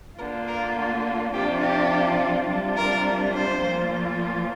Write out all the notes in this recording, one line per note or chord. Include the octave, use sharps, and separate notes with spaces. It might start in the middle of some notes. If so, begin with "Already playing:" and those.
D3 A#3 F4 A#4
A#4
C3 F3 D4 F4 G4
G4
C3 G3 D4 F4
A#4
C5
A#2 F3 A#3 F4